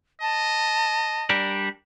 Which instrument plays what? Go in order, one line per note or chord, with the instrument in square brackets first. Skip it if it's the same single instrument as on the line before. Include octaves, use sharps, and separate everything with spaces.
[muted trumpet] D#5 [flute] A5
[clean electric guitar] G3 D4 A#4